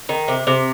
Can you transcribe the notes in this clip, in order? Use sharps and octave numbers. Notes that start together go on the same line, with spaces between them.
D#3
C3
C3